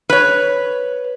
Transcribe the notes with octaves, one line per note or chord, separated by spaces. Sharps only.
B4 C#5